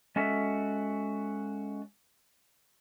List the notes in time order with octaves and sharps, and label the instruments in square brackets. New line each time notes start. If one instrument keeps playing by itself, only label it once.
[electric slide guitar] G#3 C#4 F#4 A4 E5